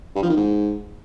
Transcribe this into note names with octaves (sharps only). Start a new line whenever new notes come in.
G2
F3
D#3
G#2